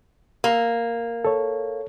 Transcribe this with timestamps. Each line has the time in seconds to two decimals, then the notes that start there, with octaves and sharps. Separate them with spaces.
0.44 A#3
1.25 A4 C#5